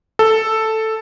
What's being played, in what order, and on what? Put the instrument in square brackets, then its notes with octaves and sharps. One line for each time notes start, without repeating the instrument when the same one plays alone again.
[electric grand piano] A4